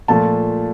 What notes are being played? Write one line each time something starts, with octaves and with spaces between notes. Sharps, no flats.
A#2 F3 A3 A5